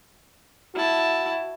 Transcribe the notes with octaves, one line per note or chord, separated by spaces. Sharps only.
E4 F#4 A5